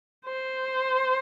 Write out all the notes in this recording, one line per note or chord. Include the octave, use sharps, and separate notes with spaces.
C5